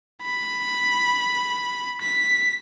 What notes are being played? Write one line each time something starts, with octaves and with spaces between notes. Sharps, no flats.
B5
B6